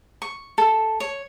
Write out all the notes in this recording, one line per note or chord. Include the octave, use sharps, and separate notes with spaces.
C#6
A4
C#5